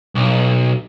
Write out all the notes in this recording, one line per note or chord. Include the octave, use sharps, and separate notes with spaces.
B1